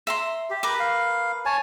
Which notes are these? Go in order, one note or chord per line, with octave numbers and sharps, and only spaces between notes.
E5 A#5 C6
G4
A#4 B4 D6
F5
C#5 G#5 A5